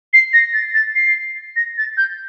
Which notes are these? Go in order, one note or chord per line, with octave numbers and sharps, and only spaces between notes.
C7
A#6
A6
A6
C7
A#6
A6
G6